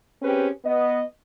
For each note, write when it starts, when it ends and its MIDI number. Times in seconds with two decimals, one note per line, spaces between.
0.22 0.48 60
0.22 0.48 61
0.22 0.48 67
0.22 0.48 68
0.22 0.48 71
0.64 1.00 59
0.64 1.00 75